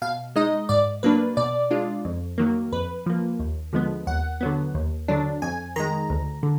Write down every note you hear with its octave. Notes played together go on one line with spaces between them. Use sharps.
B2 F5
G#3 D#4 D#5
G#2 D5
F#3 A#3 D4 B4
B2 D5
G#3 D4 F4
F2
D#3 F#3 A#3
F2 B4
F3 A#3
D#2
D3 F3 G#3 B3
D#2 F#5
D3 F#3 B3
D#2
D3 F#3 D4
F2 G#5
D#3 G#3 A#5
D2
D3